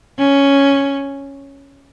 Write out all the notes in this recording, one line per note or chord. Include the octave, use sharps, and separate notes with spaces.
C#4